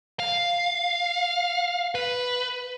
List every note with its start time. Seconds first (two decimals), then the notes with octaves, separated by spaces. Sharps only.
0.19 F5
1.95 B4